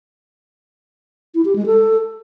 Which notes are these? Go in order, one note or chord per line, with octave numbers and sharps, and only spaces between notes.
E4
G4
G#3
A4